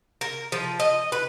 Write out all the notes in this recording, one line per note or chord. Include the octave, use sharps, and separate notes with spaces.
A#4
F3
D#5
B4